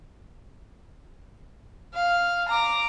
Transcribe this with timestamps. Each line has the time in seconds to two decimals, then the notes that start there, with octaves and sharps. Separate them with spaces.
1.94 F5
2.49 A#5 D6